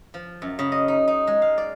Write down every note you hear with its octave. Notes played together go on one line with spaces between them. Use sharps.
F3
F#2
C#3
D#5
D#4
D#4
G#3
F5
D5